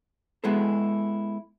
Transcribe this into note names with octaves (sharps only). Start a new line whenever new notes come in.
G#3 B3 E4 G#4 A4